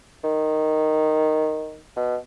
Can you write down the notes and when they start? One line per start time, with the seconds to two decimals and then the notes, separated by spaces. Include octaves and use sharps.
0.24 D#3
1.96 B2